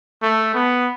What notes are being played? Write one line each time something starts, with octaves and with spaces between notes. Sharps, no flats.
A3
B3